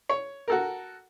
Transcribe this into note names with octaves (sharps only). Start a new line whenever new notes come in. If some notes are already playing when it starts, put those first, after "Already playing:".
C#5
F#4 A4 A#4